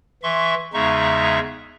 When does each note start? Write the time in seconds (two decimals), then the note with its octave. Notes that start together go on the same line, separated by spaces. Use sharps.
0.23 E3 E5 C6 C#6
0.74 E2 C#3 G#3 D#4 E5 C#6